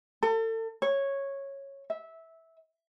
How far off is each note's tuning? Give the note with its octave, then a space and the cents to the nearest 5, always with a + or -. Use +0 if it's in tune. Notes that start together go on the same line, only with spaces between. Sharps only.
A4 +35
C#5 -10
E5 -15